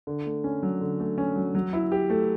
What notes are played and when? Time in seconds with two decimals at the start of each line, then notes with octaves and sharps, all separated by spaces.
0.07 D3
0.26 A3
0.44 C#4
0.63 F#3
0.81 D3
1.00 A3
1.18 C#4
1.36 F#3
1.55 F#3
1.73 E4
1.92 G4
2.10 A3